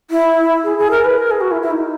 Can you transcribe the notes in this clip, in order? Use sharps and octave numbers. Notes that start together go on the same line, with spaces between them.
E4
G#4
G#4
A#4
B4
A#4
G#4
F#4
E4
E4
D#4